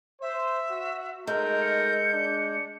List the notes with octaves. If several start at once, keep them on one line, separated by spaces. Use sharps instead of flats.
C5 E5
F#4
G#3 A3 D#4 A#4 G6
C#7
D4